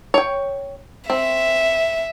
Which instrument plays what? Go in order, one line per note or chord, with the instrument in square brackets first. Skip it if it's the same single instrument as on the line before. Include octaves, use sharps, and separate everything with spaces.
[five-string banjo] C#5 G5
[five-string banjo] C4 [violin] E5